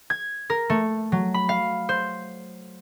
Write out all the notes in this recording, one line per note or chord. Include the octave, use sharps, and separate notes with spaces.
G#6
A#4
A3
F#3
B5
F5
C5